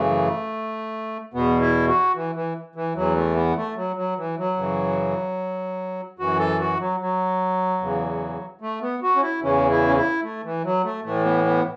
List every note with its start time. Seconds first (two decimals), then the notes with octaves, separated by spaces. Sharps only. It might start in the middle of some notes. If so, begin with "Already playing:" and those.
Already playing: F#2 C#3 E3 A3
1.34 E2 B2 B3
1.61 E4
1.88 F#4
2.15 E3
2.35 E3
2.76 E3
2.95 E2 E3 F#3
3.16 A3
3.36 B3
3.56 A3
3.76 F#3
3.96 F#3
4.17 E3
4.37 F#3
4.57 F#2 C#3 E3
6.19 F#2 E3 F#4
6.39 A4
6.60 F#4
6.80 F#3
7.00 F#3
7.81 E2 C#3 E3
8.61 A3
8.82 B3
9.03 F#4
9.16 C#4
9.22 E4
9.42 E2 C#3 E3 C#4
9.70 E4
9.88 C#4
9.96 E4
10.23 A3
10.44 E3
10.64 F#3
10.84 A3
11.04 A2 E3 A3
11.25 B3
11.45 B3